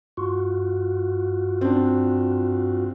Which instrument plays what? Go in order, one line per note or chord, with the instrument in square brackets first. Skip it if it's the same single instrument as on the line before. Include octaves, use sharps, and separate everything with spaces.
[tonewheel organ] G2 F4 F#4
[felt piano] C4 D4